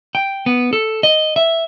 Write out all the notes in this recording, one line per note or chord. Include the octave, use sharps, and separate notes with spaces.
G5
B3
A4
D#5
E5